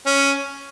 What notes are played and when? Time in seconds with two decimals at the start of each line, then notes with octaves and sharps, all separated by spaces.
0.06 C#4